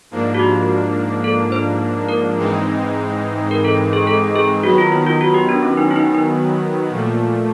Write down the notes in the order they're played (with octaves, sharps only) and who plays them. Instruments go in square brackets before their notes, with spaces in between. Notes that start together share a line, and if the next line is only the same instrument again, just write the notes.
[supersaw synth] G#2 F3 A#3 D4
[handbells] F#4
G4
A4
C5
A#4
[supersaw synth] G#2 E3 G#3 C4 D#4
[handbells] A#4
A4
G#4
A4
G#4
[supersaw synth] D#3 F#3 B3 [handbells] F#4
[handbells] F4
E4
F4
F#4
G4
D4
C#4
D#4
E4
D#4
D#4
[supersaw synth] A#2 F3 A3